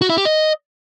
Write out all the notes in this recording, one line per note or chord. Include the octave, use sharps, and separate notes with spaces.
F#4
E4
G4
D#5